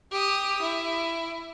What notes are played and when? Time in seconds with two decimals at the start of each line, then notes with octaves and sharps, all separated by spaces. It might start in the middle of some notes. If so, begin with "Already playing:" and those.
0.12 G4 D#6
0.62 E4